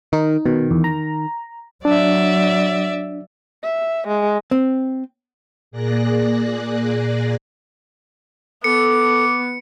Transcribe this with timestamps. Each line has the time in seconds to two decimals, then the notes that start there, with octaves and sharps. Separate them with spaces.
0.13 D#3 D#4
0.46 B2 D#3
0.71 E2
0.84 A#5
1.85 F#3 D4 D5 E5
3.63 E5
4.08 G#3
4.51 C4
5.71 A#2 A#3 G#4 D5 F#6 A#6
8.64 B3 A4 D6 C#7